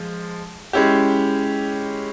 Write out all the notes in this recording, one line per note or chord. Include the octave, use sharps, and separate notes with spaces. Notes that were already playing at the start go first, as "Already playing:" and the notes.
Already playing: F3 G#3
G#3 C#4 E4 G4